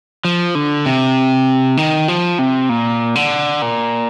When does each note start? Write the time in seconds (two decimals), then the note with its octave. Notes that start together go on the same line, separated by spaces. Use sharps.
0.25 F3
0.55 D3
0.86 C3
1.77 D#3
2.08 F3
2.39 C3
2.69 A#2
3.15 D3
3.62 A#2